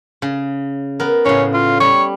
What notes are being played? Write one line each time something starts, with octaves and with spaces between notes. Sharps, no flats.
C#3
B3 A#4
A2 C#3 C#4
F4
G3 C#5